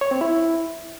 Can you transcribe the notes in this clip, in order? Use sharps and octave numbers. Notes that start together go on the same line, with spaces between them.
C#5
C4
E4